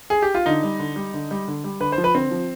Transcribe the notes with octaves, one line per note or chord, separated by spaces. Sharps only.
G#4
G4
F4
D3 D#4
G3
D3
G3
D3
G3
D3
G3
D3 B4
C5
F3
B4
D3 C4
F3